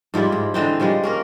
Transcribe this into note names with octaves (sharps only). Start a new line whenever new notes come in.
G#2 F3 G3 E4
G#2
D3 E3 C4 D#4
C#3 F3 G3 G#3
A#3 C#4 A#4